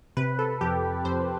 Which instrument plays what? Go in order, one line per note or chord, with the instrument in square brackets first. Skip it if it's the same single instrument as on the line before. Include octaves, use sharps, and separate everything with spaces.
[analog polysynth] C3 B4
A4
F2 G4
F2 C5